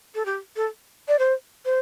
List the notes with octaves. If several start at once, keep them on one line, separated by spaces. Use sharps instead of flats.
A4
G4
A4
D5
C5
C5